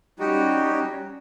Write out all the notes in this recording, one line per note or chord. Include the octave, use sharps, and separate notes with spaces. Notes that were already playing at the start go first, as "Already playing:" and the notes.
G3 C#4 D#4 F#4 G4